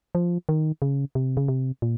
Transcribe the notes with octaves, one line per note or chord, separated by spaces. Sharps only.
F3
D#3
C#3
C3
C#3
C3
A#2